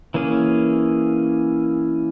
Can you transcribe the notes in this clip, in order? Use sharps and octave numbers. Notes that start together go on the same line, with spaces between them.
E3 A#3 C#4 G#4